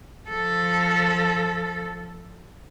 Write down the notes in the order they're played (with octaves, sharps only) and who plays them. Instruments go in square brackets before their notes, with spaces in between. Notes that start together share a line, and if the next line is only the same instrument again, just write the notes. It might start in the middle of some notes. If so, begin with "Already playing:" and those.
[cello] F3 A4